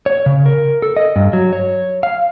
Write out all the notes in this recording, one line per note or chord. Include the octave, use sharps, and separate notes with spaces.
C#5
C#3
A#4
A4
D#5
G2
F#3
C#5
F5